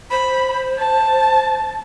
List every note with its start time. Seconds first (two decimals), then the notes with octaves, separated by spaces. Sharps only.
0.11 C5 B5
0.78 A5